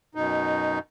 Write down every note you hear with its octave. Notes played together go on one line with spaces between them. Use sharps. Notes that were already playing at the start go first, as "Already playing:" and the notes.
F#2 B2 D#4